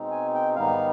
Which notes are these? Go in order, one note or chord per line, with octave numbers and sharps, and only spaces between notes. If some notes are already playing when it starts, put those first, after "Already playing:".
Already playing: B2 G#3 C4 D#4
G#5
G5
G#2 D#3 G3 B3 D#4 F5